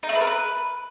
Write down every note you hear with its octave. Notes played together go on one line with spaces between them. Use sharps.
D#4
A3
B4
A#4
B4